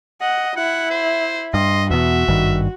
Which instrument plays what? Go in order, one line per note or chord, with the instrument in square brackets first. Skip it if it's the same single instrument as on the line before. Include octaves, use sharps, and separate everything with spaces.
[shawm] D#5 [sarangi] F#5
[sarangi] E4 [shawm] F#5
[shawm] C5
[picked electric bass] G2 [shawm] D#5 [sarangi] C6
[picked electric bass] E2 B2 [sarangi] F#4 [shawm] E5
[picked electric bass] G#1 G2 D#3